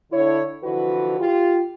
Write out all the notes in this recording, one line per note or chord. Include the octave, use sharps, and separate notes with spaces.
D3 E4 C#5
D3 E3 F3 F#4 B4
F4 G4